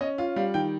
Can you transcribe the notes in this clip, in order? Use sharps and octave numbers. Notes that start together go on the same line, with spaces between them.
C#4 D#5
F4 F5
G3 F5
D#3 G5